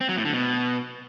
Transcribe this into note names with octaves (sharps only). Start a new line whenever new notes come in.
C4
F#3
A2
D3
B2